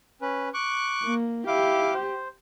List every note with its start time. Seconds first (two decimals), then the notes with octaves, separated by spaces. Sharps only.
0.22 C#4 B4
0.54 C#6 D6 F#6
1.03 A#3
1.47 E4 G4 F5 D6
1.94 C5